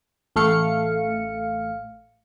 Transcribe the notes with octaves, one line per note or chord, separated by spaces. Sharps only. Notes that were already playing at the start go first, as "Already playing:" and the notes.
A1 A3 F5 C#7